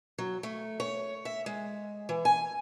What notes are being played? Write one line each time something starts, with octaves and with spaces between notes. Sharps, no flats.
F#3
A3
C#5
E5
G#3
E3
G#5